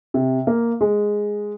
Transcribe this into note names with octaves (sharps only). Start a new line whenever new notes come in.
C3
A#3
G#3